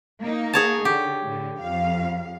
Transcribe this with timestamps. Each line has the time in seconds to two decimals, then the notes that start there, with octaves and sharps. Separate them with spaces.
0.21 A#3 D#4
0.53 G#4 C#5 A5
0.85 D3 G4
1.25 A2 D3
1.61 F2 F5